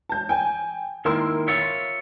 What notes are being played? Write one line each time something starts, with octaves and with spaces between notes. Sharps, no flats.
A5 G6
G5 G#5
D#3 A#3 E4 A#4 C6 E6
F4 C#5 E5